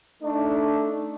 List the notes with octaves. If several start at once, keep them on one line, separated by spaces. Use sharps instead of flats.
A3 D4 D#4